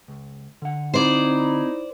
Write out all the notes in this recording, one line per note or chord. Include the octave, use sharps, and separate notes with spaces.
C#2
D3 F#5
C4 D#4 E4 C5 D5